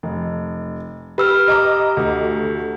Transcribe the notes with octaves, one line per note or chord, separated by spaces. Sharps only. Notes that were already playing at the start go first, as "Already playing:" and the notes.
F1
G4 B4 E6 F6
D#5 A#5 D6
D2